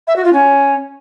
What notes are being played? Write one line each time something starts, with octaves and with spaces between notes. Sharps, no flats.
E5
F#4
F4
C#4